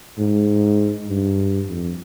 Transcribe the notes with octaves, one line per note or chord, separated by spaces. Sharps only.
G#2
G2
F2